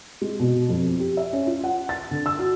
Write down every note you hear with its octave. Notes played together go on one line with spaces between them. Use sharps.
G#3
B2
F2
G4
E5
C#4
F4
F#5
A6
D3
E6
F#4